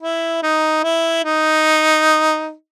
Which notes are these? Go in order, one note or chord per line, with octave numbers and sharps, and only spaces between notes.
E4
D#4
E4
D#4